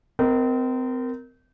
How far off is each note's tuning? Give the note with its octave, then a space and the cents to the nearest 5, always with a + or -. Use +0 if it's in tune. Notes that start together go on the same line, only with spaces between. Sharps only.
C4 -30 A#4 +0 D#5 +10